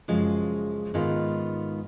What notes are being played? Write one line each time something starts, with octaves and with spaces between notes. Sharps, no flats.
F#2 C#3 F3 G#3
G#2 D#3 G#3 B3 F4